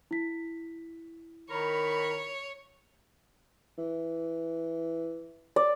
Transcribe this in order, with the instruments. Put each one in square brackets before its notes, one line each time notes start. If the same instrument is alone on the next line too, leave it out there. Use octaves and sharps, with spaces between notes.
[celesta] E4 B6
[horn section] D#3 A#4 B5 [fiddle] C#5
[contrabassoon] E3
[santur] D5